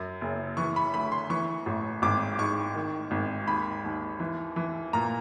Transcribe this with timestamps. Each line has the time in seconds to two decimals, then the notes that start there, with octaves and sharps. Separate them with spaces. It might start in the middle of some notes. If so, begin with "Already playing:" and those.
Already playing: F#2
0.21 F#1
0.57 E3 C#6
0.76 B5
0.94 D2 B5
1.12 C6
1.30 E3 C#6
1.66 A1
2.02 G#1 D6
2.38 G#2 C#6
2.75 D#3
3.11 G#1
3.47 D#2 B5
3.84 D#2
4.20 E3
4.56 E3
4.93 A#2 A#5